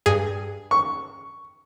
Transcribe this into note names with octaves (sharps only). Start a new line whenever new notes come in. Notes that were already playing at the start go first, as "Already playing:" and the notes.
G2 G#4
C#6